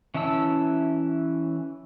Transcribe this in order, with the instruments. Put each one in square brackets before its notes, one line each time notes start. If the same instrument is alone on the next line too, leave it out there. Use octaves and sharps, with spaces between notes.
[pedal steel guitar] E3 C#4 E4 A5 E6